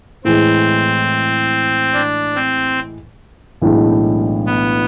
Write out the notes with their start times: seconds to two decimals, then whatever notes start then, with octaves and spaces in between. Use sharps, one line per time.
0.24 A2 E3 G#3 C4
1.93 D4
2.35 C4
3.61 B1 A2 E3 G#3 D4
4.46 B3